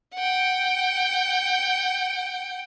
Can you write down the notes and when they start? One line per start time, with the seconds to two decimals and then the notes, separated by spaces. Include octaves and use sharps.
0.14 F#5 G5